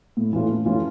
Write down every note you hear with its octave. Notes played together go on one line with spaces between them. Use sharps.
A2
E3 A3 C#4 F4
A2
E3 A3 C#4 F4